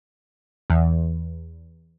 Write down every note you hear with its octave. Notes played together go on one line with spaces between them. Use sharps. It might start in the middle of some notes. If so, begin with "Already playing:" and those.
E2